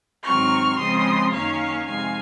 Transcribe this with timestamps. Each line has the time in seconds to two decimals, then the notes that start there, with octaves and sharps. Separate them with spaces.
0.23 G#2 D#3 F#3 C4 C#6 F6
0.78 C#3 F3 G#3 C4 C6 D#6
1.32 F#2 D#3 A#3 C#4 C#5 F5
1.86 F2 C3 D#3 G#3 F5 G#5